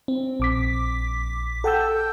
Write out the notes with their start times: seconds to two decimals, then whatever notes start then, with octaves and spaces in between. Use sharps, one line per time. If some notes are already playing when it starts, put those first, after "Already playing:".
0.08 C4
0.40 A#1 D6 B6
1.64 A4 F#5 G5 A5 E6 G6